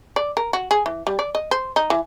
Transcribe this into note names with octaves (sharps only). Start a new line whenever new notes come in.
D5
A#4
F#4
G#4
E3
G3
D5
D#5
C5
D#4
E3